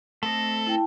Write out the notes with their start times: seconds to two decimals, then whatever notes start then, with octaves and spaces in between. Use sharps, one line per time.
0.23 A3 C4 A4 D#5
0.67 E4 G5 A5